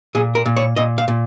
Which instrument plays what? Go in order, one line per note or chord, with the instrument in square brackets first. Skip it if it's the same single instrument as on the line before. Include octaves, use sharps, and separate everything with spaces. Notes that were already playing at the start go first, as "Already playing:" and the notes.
[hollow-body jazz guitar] A#2 G#4
A#4
A#2
C#5
A#2 D#5
F5
A#2